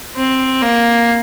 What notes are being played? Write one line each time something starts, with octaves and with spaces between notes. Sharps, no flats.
C4
A#3